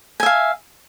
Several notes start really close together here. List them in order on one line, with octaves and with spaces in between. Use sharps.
G#5 E5 F5